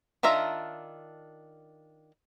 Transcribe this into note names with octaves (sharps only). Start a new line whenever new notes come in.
D#3 D4 F4 E5 A#5